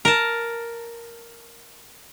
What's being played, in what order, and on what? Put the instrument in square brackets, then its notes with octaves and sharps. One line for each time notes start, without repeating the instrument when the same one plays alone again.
[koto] A#4 A5